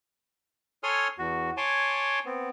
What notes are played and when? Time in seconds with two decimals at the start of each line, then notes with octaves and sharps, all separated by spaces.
0.83 A4 C#5 G#5 C6 D#6 F6
1.18 E2 F#4
1.57 C#5 G#5 A5 C6 D6
2.26 B3 C4